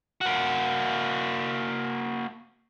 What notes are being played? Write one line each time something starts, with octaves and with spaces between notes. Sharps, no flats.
A#3 F#4